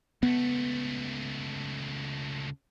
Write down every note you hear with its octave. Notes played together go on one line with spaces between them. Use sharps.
C#2 A3 B3